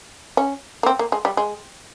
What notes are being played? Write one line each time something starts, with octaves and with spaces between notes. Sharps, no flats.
C#4
A#3
C4
A#3
G#3
G3
G#3